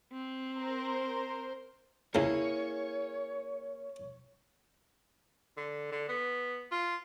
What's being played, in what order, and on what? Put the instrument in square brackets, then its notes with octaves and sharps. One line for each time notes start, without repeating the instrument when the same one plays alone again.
[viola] C4
[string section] A#4 C5
[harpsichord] C#2 A#4 [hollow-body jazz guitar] A#3 E4 G#4 [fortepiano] C#4 [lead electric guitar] C#5
[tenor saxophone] D3
D3
B3
F4